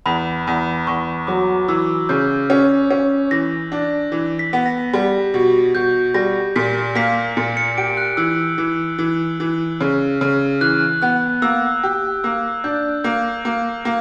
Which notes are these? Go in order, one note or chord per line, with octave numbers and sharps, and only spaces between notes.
E2 B5
E2
E2 C#6
F#3 D6
E3 E6
C#3 G6
C#4
C#4
E3 A#6
D4
E3
B6
B3
A#6
G3
B2
B2 G6
G3 A#6
A#2 B6
A#3 B6
A#2 C#7
C#7
G4 D7
F#6
E3 E6
E3
E3
E3
C#3
C#3
E3 F#6
B3 F#6
A#3 E6
G4
A#3 E6
D4 G6
A#3 G6
A#3
A#3